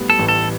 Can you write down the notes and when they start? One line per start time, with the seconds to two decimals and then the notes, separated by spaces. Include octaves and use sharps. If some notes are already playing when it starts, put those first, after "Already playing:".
Already playing: A2 G3 B3
0.10 A4
0.19 A1
0.28 A4